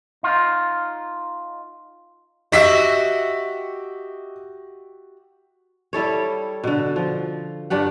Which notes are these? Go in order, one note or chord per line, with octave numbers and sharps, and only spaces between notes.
D#4 F4
F#4 G4 D#5 E5 B6
G3 E4 A4 C#5
B2 D3
F3
G2 D4 G4 F#5